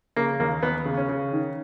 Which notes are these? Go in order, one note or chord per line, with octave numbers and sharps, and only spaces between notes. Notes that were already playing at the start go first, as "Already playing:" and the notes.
C#3 A#3
D#2 A#3
D#2 B3
C#3
C#4
C#3
D#3